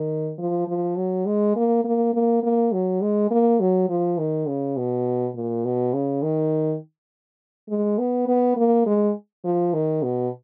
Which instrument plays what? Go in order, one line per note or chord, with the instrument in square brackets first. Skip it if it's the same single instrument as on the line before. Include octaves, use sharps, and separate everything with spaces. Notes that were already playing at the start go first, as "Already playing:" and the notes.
Already playing: [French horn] D#3
F3
F3
F#3
G#3
A#3
A#3
A#3
A#3
F#3
G#3
A#3
F#3
F3
D#3
C#3
B2
A#2
B2
C#3
D#3
G#3
B3
B3
A#3
G#3
F3
D#3
B2